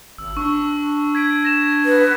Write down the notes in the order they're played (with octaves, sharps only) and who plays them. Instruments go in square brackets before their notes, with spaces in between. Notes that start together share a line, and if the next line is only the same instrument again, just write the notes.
[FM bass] G#1 [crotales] E6
[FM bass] D4 [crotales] C#6 E6
[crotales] G#6 B6 D7
A#6 E7
[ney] B4